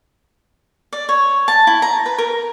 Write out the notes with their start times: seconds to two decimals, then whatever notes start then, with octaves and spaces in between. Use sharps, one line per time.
0.93 D5
1.09 C#5
1.48 A5
1.67 E4
1.82 A#5
2.06 B4
2.18 A#4